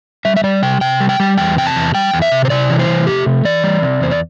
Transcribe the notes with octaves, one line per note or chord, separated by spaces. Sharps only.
G3 E5
E5
G3 D5
C3 G5
C3 G5
G3
G5
G3
E2 G5
C3 G5
A5
E2
G3 G5
E2
E5
C3
C5
C3 D5
E3
C5
C3
A3 G4
C3
E3 D5
G3
C3
E2 C5
D5